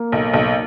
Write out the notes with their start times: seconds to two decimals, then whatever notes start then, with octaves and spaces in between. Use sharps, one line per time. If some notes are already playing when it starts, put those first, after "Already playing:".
Already playing: A#3
0.12 B1
0.33 B1